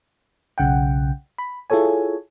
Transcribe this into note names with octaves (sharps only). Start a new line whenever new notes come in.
B1 C#3 F#5 G5
B5
E4 F4 G#4 A4 C#5 G#5